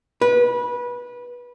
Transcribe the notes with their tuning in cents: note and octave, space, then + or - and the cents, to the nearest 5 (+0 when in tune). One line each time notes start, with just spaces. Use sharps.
B4 -20